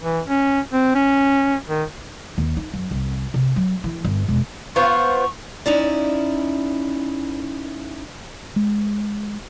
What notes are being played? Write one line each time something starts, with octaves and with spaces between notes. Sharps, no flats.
E3
C#4
C4
C#4
D#3
D#2
D#4
F#2
C2
C3
F#3
E3
G1
E1
B3 F4 C5 C#6
C#4 D#4 E4 D5
G#3